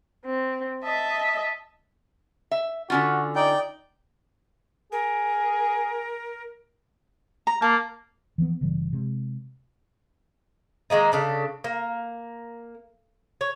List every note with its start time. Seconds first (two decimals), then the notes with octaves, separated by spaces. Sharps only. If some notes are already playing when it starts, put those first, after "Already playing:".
0.24 C4
0.83 D#5 E5 A5
2.51 E5
2.90 D3 C#4 F4 F#4
3.36 D#4 D5 G5
4.92 G#4 A#4
7.47 A#5
7.62 A#3 A5
8.38 E3 F3 G#3 B3
8.61 G1 C#3 E3 G3
8.93 C3 G#3
10.90 D#3 G#3 A#3 D#4
11.12 C#3 D4 A4
11.64 A#3
13.41 C#5